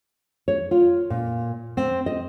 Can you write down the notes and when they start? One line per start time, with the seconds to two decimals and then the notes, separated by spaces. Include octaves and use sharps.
0.48 C#5
0.71 F4
1.10 A#2
1.77 C4
2.06 D#5